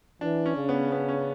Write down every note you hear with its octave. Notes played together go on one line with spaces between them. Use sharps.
E3 D4
C#4
C#3
B3
B3
C#4